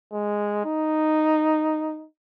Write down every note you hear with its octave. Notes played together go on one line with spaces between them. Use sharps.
G#3
D#4